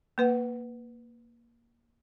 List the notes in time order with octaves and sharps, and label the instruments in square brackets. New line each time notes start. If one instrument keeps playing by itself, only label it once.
[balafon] A#3 B4 F#5